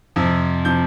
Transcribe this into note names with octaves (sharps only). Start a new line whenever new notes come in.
F2 C3 F3
C3 F3 G6